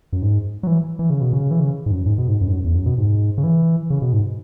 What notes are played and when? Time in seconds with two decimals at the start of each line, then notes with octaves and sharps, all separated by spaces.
0.13 F#2
0.22 G#2
0.63 F#3
0.67 E3
0.99 E3
1.10 C#3
1.21 B2
1.33 C#3
1.51 E3
1.60 C#3
1.86 G#2
1.91 F#2
2.06 G#2
2.18 B2
2.28 G#2
2.41 F#2
2.47 G#2
2.52 F#2
2.64 E2
2.75 F#2
2.86 B2
2.98 G#2
3.38 C#3
3.44 E3
3.90 C#3
4.02 B2
4.13 G#2